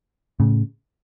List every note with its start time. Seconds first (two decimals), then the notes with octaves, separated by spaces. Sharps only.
0.40 A2 C#3